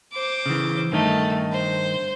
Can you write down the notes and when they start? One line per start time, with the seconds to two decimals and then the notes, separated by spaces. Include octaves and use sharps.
0.12 C5 D6
0.46 C#3 E3
0.92 G2 D#3 A3 D#4
1.52 C5